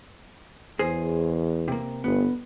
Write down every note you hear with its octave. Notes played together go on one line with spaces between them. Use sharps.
E2 G#4 C5
C3 A#3
G1 B3